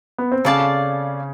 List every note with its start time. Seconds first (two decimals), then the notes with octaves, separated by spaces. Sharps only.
0.18 B3
0.32 C4
0.45 C#3 C#4 A4 D5 F5 A5